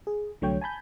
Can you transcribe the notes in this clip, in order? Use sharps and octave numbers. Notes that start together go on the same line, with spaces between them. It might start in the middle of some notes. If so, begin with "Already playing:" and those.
G#4
C2 D3 F#3 A3 C#5 G5
G#5 A5 B5 G6